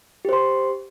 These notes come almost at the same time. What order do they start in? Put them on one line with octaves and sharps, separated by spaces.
G4 C5 C6